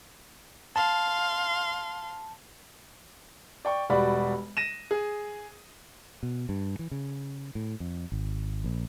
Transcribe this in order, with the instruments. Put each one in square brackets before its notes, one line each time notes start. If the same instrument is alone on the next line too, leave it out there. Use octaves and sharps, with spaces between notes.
[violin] F5 C6 [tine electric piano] A5
[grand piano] D5 G5 C#6
E1 G3 F#4 D5 B5
A#6 D#7 E7
G#4
[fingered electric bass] B2
G2
E3
C#3
A2
F2
G#1
A#1